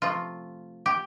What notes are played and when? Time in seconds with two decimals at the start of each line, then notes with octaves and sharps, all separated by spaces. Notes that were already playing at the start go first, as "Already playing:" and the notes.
0.02 C3 F3 A3 F4
0.86 G4